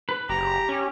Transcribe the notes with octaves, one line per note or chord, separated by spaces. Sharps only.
B4
F#1 G4 A#5
C#4